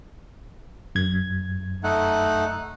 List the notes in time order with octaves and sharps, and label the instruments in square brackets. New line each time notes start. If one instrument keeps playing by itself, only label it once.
[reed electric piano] F#2 G#6
[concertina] A3 D#4 F#5